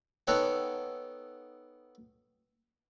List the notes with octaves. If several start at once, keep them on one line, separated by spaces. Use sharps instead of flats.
B3 D#4 A4 C#5 F#5 G5